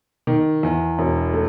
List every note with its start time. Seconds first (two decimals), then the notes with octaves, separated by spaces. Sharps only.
0.27 D#3
0.63 E2
0.99 E1
1.33 A3